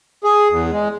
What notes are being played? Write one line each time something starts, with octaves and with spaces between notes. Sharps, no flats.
G#4
E2
G#3